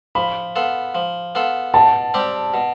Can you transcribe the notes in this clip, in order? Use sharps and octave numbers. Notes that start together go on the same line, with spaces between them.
F3 B5
B3 F4 A4
F3
B3 F4 A4
B2 A5
G3 C4 G4
B2